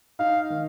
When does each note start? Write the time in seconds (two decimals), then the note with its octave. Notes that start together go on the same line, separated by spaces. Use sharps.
0.19 D#4 F5
0.50 D#3